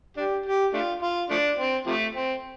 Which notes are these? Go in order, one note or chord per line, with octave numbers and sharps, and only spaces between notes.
D4 G4
G4
A3 D4 F4
F4
F3 A3 D4
C4
C3 F3 A3
C4